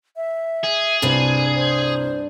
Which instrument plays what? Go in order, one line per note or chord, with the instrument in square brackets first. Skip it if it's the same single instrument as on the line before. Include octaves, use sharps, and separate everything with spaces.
[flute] E5
[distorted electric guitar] G#4
[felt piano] C2 [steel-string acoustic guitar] G2 D4 [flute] C5
[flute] C5